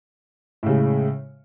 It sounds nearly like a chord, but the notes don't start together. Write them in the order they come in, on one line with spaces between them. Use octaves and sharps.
A2 C#3 G#3